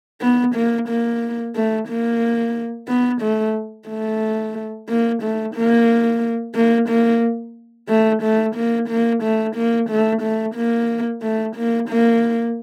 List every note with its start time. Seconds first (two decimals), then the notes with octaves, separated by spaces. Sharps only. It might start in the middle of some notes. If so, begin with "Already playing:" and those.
0.21 B3
0.56 A#3
0.89 A#3
1.55 A3
1.89 A#3
2.88 B3
3.22 A3
3.88 A3
4.89 A#3
5.22 A3
5.55 A#3
6.55 A#3
6.89 A#3
7.89 A3
8.23 A3
8.56 A#3
8.89 A#3
9.23 A3
9.56 A#3
9.90 A3
10.22 A3
10.55 A#3
11.22 A3
11.56 A#3
11.89 A#3